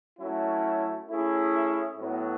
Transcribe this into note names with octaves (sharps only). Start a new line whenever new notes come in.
F#3 A3 C#4 E4
A3 C#4 E4 G#4
A2 F#3 B3